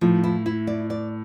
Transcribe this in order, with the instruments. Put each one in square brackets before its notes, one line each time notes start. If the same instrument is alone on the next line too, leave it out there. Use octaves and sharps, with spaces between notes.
[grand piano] A2 [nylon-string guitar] F3
[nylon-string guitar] E4
E4
D5
D5